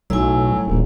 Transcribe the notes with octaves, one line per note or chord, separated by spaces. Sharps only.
B1 A2 F#3 G#5 E6
D#1 A#1